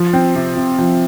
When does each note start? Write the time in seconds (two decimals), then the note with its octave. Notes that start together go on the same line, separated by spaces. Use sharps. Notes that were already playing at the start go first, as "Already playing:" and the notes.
Already playing: F3
0.13 C4
0.36 C3
0.57 C3
0.79 F3